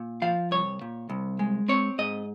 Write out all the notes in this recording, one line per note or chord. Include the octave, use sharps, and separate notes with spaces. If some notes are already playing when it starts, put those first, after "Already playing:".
Already playing: A#2
F3 F5
C2 C#5
A#2
C2
G#3
C4 C#5
G#2 D#5